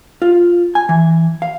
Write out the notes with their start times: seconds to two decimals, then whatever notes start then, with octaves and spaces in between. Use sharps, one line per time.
0.22 F4
0.75 G#5
0.89 E3
1.42 F5